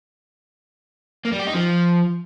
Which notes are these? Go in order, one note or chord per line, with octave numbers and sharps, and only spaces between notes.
A#3
G3
G4
D#4
F3